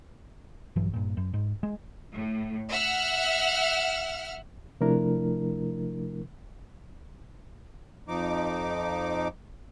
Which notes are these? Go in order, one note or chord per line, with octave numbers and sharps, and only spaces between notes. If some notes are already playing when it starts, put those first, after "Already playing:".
A#1 G2 E3 F#3
G2 A#2
F#2
G#2
G#3
A2
E5 F#5 F6
C3 F3 A3 D4 E4 A#4
F2 F3 D#4 D6